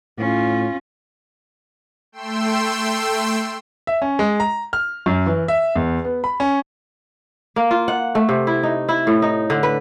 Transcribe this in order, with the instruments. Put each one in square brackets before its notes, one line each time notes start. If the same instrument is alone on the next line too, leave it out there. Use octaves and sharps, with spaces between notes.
[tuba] A2 [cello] C#4 F4
[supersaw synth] A3 G5 C6 E6
[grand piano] E5
C#4
G#3
A#5
F6
F#2
E3
E5
E2
B3
B5
C#4
[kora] A#3
F4
F#5
A3
C3
E4
D#4
E4
A2
D#4
D3
B4